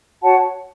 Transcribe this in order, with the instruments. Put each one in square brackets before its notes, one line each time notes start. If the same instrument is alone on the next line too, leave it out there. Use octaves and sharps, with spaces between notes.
[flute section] F#4 C#5 F#5 A5